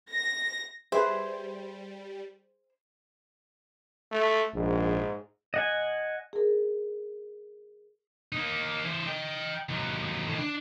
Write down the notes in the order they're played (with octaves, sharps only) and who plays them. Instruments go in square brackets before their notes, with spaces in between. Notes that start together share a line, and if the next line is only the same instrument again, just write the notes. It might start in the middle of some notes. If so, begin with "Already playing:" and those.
[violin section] A#6
[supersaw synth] G3 [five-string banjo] G#4 [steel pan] B4 E5 [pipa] C5
[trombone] A3
[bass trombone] A#1 [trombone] G#2
[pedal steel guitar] D#5 F#5 G#5
[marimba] G#4 A#4
[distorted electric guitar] A#3 D#4
E3 C5
D#5 G5
D#2 F#3
A2 D#3
D4